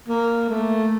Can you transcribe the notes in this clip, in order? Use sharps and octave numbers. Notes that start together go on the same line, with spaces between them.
A#3
A3